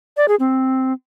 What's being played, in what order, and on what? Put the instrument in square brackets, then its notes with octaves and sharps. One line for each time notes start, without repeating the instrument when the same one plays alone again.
[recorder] D5
G#4
C4